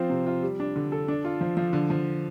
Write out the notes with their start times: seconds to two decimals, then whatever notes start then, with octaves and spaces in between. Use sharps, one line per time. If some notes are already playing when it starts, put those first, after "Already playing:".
Already playing: F3 C4 F4
0.10 C3
0.26 F4
0.43 G3
0.60 D4
0.76 D3
0.92 A4
1.08 D4
1.25 F4
1.41 F3
1.57 F3
1.73 D3
1.90 F3